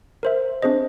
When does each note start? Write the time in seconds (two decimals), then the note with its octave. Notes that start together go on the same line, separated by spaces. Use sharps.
0.23 A#4 C5 E5
0.62 C4 D4 G#4 C5 D#5